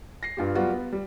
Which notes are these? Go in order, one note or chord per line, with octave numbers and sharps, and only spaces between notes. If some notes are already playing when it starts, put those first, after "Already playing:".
A#6 C7
G2 F4 G4
F#3 G3 B3 F4 F#4
B3
G3